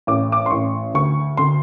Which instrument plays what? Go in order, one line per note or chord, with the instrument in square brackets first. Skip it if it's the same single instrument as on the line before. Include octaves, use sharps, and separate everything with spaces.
[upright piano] A1 D6
D6
C6
A1 C#6
D2 C#6
D3 C6